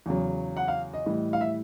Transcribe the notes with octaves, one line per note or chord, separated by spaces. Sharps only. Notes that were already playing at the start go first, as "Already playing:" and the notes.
E2 C#3 F#3
F#5
F5
D#5
A2 E3 G3
F5
E5